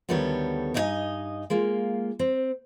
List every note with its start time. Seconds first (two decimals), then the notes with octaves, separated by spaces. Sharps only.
0.09 D2 D#3 G3 B3 A4 C#5
0.74 G2 D#4 E4 G#4 D#5 G#5
1.50 G#3 A#3 F4
2.19 C4